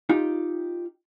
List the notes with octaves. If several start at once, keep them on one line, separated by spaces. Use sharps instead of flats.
D#4 F4 G4